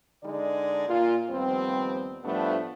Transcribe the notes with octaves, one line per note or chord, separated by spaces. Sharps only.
D3 G#3 D#4 D5
A#2 F4
D#2 F3 G3 B3 C4
A2 F3 G3 A3 B3 D4